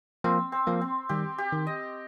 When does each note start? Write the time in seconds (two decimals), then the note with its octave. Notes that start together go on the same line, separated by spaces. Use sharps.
0.24 F3 A#3 C4
0.52 C4
0.67 F3 A#3
0.81 C4
1.09 D#3 G3 G4
1.38 G4
1.52 D#3
1.67 D#5